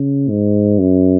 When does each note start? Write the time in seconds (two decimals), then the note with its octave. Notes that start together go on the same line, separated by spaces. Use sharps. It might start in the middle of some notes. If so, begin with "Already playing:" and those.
Already playing: C#3
0.29 G#2
0.79 F#2